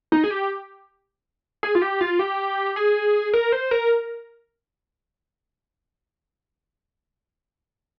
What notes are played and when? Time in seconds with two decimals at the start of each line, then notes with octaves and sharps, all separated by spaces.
0.12 D#4
0.24 G#4
0.31 G4
1.63 G#4
1.75 F4
1.82 G4
2.01 F4
2.19 G4
2.76 G#4
3.33 A#4
3.52 C5
3.71 A#4